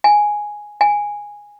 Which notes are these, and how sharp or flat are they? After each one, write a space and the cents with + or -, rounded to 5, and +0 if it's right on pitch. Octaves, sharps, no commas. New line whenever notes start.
G#5 +0
G#5 -10